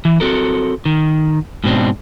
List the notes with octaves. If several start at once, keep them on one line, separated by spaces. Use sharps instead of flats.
E3
C4 F#4 A4 A#4
D#3
G#2 B2 C4 D4